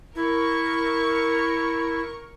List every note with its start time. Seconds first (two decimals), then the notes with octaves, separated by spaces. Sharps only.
0.15 E4 A#4 C#6